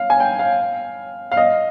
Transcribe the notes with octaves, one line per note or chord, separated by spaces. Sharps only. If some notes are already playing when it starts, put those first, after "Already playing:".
Already playing: F5
G#5
G5
F5
F5
D#5